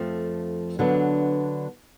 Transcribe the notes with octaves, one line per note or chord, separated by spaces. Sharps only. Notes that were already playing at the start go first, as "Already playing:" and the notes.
Already playing: F2 F3 A3
D3 F#3 B3 D4